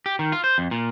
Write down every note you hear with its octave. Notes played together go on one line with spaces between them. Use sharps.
G4
D#3
F4
C5
F2
A#2